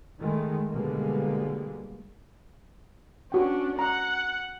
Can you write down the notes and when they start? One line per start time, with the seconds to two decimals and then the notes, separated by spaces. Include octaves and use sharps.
0.19 D#3 G#3 A3
0.70 B2 D3 G3 G#3 A#3
3.32 C#4 D4 F#4 G5
3.79 F#5 A#5